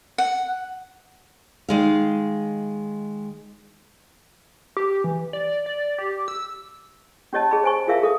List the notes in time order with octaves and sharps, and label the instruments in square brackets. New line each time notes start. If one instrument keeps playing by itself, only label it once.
[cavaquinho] F#5
[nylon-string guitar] D#3 G#3 F5
[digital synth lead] G4
E3
D5
D5
G4
E6
[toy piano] C#4 G4 C#5 D#5 A5
G#4 D#5 B5
C5 G#5 C#6
F4 G#4 A#4 E5 F5
G#4 A4 D#6